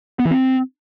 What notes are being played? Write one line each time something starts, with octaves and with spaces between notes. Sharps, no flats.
B3
E3
C4